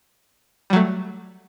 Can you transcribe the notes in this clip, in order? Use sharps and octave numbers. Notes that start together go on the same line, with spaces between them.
F#3 G3 A3